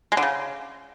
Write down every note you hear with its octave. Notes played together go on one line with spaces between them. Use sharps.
G#3
D3
C#3